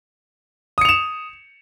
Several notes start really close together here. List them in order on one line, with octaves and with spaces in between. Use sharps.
D#6 C#7 F7 E7